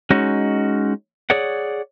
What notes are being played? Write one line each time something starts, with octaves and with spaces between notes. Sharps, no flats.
G#3 C#4 D#4 F#4
G#4 C#5 D5 F#5